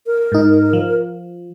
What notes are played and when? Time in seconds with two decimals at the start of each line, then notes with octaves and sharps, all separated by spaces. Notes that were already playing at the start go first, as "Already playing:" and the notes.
0.07 A#4
0.32 G#2 D#4
0.73 F3